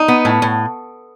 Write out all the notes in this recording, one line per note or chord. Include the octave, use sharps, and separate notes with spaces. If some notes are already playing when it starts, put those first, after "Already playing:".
Already playing: D#4
B3
A2
A2